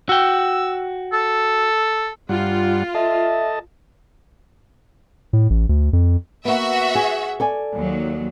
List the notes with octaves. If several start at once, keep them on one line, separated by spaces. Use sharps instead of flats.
F#4 G5 E6
A4
G2 G3 F4 F#5
A4 D#5 E5 A5
A2
A1
D2
F2
A#3 B3 F#4 E5
G#4
A4 D5 G#5
D#2 F#3